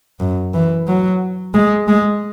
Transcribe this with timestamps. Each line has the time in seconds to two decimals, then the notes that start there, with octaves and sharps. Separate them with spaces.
0.20 F#2
0.54 E3
0.88 F#3
1.54 G#3
1.88 G#3